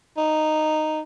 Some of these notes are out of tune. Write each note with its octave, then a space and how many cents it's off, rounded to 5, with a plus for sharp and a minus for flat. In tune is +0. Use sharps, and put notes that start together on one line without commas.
D#4 -10